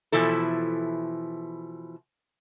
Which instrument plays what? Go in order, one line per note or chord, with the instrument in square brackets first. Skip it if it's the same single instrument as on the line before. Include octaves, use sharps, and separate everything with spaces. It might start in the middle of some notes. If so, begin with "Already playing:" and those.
[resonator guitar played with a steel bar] B2 E3 F3 E4 A4